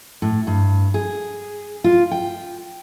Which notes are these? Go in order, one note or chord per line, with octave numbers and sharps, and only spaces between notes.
A2
G2
G#4
F4
G5